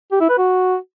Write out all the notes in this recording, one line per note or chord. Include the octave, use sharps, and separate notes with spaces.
G4
E4
B4
F#4